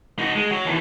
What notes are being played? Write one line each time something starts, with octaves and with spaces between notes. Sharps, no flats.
D#4 F#4
G#3
F#3
D#2 E3